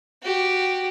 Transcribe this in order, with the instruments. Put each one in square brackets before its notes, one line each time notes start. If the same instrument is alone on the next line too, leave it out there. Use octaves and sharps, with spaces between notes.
[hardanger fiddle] F#4 G4